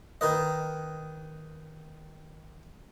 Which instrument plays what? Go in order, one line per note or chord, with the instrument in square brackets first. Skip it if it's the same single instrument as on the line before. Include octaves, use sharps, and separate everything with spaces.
[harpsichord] D#3 A#4 B4 D#5